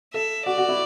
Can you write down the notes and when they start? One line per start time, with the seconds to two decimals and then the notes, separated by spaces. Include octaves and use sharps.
0.14 A4 E5
0.46 F#4 D5
0.58 F#4
0.69 E4